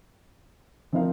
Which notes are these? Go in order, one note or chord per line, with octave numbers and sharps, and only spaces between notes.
F3 C4 D#4 A#4 F5